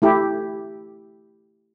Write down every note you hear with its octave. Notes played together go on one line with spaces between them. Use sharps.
A3 E4 G4